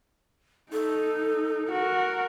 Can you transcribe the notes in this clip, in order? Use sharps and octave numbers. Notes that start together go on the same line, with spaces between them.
D#4 A4
F#4 A#4